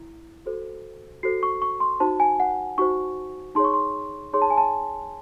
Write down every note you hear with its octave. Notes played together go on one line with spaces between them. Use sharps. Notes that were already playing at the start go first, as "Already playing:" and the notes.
Already playing: E4
F#4 A4 C5
F#4 A4 C5 C7
C#6
C#6
C6
D#4 F#4 C5 A5
G#5
F#5
D#4 F#4 C5 C#6
D#4 G#4 C#5 C6
C#6
C6
D#4 G#4 C#5 C6
A5
G#5
A5